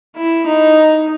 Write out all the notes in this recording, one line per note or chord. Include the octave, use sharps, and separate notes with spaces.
E4
D#4